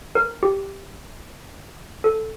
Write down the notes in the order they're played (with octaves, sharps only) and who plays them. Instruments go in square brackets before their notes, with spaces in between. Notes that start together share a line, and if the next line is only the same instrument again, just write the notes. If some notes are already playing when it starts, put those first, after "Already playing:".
[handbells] A#4
G4
A4